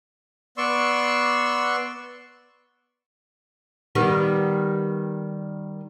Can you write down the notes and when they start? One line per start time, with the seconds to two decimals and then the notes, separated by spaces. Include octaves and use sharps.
0.58 B3 D5 C6 C#6 E6
3.95 D#3 G3 B3